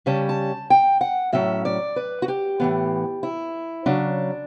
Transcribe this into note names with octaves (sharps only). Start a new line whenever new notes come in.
C#3 G3 C#4 A5
A5
G5
F#5
A2 F#3 C#4 E5
D5
B4
F#4
G4
A2 E3 B3
E4
C#3 F#3 C#4 D4